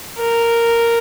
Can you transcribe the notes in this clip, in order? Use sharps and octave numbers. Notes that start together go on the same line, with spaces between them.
A#4